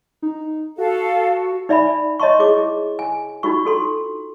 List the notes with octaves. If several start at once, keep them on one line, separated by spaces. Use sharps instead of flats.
D#4
F#4 A4 F5
D#4 D5 E5 G#5 B5
C#5 D#5 E5 A5 C6 C#6
E4 G#4 D6
G#5
D4 D#4 F4 F#4 C#6
F#4 A4 C6